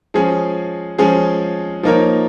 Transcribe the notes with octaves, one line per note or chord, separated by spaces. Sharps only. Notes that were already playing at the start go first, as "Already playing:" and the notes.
F3 G#3 C#4 G#4
F3 G#3 C#4 G#4
F3 A#3 D#4 A#4 C#5